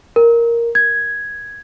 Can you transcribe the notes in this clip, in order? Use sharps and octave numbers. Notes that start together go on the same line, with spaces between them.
A#4
G#6